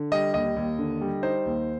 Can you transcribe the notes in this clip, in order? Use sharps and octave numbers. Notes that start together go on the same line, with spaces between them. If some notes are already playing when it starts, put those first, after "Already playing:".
Already playing: D3
G3 D#5
D#2 D#5
D#2
D3
G3
D#4 C5
D#2